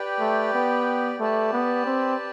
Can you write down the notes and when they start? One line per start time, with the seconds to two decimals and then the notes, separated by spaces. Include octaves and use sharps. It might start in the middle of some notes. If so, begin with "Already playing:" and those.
Already playing: G4 B4 D5 G5
0.20 A3
0.53 B3
1.20 A3 G4 B4 D5 A5
1.52 B3
1.86 C4